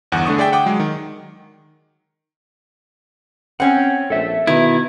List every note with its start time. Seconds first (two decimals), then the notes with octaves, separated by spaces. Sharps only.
0.12 G1 E2 F#5
0.25 D3 A3 D4 C#6 D#6
0.38 G#4 D5 E5 G5
0.52 F#5 G5 D6 D#6
0.66 F#3 G#3
0.79 D#3
3.60 C4 C#4 F#5
4.10 A#1 A4 E5
4.47 B2 D#3 E4